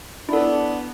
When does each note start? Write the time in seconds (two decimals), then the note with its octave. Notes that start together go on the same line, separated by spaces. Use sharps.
0.29 B3 D4 E4 A4